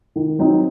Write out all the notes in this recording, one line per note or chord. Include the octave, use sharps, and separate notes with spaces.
D#3
F#3 C4 D#4